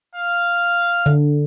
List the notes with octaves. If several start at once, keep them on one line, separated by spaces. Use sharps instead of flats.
F5
D3